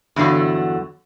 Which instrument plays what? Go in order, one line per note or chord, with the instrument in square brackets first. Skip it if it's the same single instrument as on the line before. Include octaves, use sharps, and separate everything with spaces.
[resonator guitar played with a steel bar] E2 G2 D3 F#3 F#4